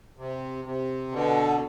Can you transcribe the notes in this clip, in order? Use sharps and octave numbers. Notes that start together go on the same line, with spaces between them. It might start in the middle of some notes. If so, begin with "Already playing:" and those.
C3
C3
B2 D3